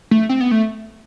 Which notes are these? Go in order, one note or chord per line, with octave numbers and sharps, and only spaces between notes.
A3
C4
B3
A3